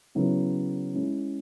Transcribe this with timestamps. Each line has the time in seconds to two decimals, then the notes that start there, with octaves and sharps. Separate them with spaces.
0.15 C#3 F#3 B3 E4
0.94 G#3 C#4 E4